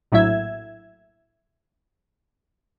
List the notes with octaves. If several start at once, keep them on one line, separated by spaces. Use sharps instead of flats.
A#1 A2 F#3 E4 E5 G#6